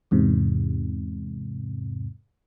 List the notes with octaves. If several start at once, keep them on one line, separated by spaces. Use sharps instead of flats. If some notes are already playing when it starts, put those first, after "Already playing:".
E2 G#2 C3